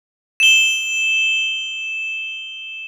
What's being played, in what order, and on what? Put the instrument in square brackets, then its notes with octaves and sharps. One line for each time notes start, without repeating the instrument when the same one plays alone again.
[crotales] E7 G7